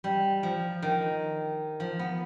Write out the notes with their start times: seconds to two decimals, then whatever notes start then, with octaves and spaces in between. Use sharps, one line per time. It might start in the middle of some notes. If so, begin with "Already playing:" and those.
0.04 G3
0.43 F3
0.82 D#3
1.80 F3
1.99 B3